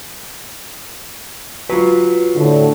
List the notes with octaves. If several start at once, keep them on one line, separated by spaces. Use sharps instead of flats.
F#3 F4 B4
A2 D3